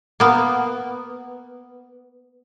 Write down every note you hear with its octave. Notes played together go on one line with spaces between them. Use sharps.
A#3 B3